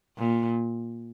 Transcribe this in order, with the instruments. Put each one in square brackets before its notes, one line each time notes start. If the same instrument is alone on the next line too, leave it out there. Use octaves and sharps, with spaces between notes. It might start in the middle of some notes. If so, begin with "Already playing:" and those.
[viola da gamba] A#2